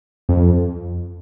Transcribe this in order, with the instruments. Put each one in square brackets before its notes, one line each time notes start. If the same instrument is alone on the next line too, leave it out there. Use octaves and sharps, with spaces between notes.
[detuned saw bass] F2